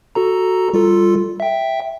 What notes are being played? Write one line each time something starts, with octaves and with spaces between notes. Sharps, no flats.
F#4 A4 A#5
G3 F4 A4
E5 G5